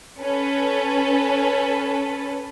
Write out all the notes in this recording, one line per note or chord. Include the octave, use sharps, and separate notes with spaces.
C#4 A4 B4